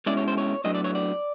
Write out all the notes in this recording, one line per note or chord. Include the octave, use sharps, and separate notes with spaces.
B2 G#3 C#4 E4 D5
C#5
C5
C#5
A2 F#3 B3 D4 D#5
D5
C#5
D5